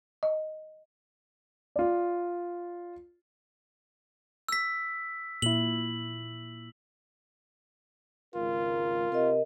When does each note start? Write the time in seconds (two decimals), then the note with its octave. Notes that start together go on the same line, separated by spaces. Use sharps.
0.23 D#5
1.76 F4 D5
4.49 E6 B6
5.42 A#2 E4 F#7
8.35 G#1 C#2 F4 A#4
9.12 C3 A#4 D#5